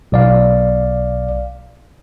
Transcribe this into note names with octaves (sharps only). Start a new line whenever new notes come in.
B1 D5 F5